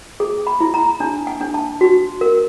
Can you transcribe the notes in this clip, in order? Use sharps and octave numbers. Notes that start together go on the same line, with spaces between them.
G#4
B5
E4
A#5
D4 A5
G#5
D4
A5
F#4
A#4